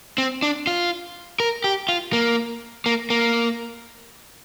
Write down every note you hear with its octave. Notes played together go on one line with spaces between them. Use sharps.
C4
D4
F4
A#4
G4
F4
A#3
A#3
A#3